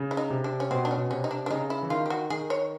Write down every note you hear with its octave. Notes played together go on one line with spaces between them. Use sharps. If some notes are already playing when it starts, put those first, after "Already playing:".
Already playing: C#3
E4
D#4
C3
D4
C#4
B2 C4
D4
C#4
B2
C3 C#4
D#4
D4
D4
C#3 D#4
E4
E3
D#3 F4
G4
F#4
D#3 G#4
C#5